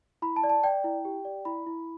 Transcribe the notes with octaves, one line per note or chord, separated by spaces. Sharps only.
E4 B5
A5
D5
A5
D5 G5
E4
G4
D5
E4 B5
E4